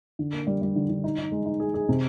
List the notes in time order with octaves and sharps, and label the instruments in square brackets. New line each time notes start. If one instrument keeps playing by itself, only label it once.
[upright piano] D3
A#3
G3
G3
D3
D3
D#4
D#4
G#3
D#4
G#4
G#4
C3